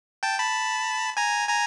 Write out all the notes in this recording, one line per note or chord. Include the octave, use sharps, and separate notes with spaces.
G5 A5
A5 B5
G#5 A#5
G#5 A#5